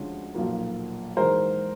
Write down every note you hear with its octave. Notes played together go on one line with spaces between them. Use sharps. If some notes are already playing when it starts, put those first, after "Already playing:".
Already playing: D2 D3 F3 G#3 C#4
B1 A#2 F3 A#3
G#2 E3 G#3 A#4 C5